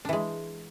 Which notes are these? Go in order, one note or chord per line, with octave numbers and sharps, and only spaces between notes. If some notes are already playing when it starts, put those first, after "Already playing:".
E3 G#3 D4